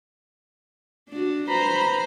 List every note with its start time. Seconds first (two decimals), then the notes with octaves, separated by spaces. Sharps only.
1.09 D4 F#4
1.49 B4 C5 A#5 B5